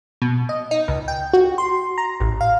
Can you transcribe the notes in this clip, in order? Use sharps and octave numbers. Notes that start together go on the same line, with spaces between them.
B2
D#5
D#4
C#2
G5
F#4
C6
A#5
A1
F5